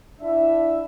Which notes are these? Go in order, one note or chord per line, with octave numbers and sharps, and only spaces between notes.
D4 E4 E5